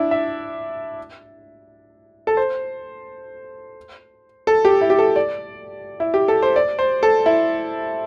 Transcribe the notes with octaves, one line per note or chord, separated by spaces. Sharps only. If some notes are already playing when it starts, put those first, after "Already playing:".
Already playing: D4 E4
E5
A4
C5
A4
G4
E4
G4
A4
D5
E4
G4
A4
C5
D5
C5
A4
E4